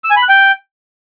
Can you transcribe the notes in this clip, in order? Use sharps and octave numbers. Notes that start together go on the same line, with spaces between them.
E6
G#5
B5
F#6
G5